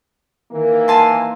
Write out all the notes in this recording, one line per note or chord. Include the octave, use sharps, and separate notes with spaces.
D#3 E3 A#3
G#5 A5 C6